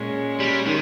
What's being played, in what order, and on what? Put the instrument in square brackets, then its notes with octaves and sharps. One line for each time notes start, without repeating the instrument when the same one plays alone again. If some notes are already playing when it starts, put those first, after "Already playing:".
Already playing: [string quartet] A#2 G#3 C#4
[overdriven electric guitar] G3
D#3